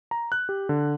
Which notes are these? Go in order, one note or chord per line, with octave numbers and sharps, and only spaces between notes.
A#5
F#6
G4
D3